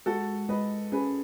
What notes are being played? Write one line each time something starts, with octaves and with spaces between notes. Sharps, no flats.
G#3 F#4 A4
G#3 B4 D#5
C#4 G#4 B4